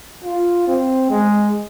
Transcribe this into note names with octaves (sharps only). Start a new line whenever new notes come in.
F4
C4
G#3